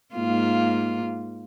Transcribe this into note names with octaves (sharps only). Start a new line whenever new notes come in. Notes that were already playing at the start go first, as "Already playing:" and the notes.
G#2 A#3 F4